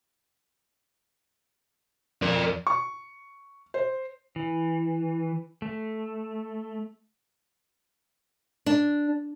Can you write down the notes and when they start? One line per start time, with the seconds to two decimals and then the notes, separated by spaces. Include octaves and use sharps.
2.22 F2 A#4 D5
2.67 C#6
3.74 C5
4.36 E3
5.62 A3
8.66 D4